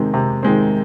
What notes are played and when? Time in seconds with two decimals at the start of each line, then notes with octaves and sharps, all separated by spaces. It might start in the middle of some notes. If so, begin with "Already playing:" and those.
Already playing: C3 D#3 G#3 C4
0.14 C3
0.43 D#3 G#3 C4